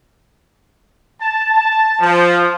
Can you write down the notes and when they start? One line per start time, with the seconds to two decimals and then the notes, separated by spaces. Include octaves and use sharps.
1.20 A5
1.53 A5
1.99 F3